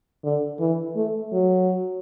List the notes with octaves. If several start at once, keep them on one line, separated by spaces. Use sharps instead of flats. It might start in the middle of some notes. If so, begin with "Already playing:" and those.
D3
E3
A3
F#3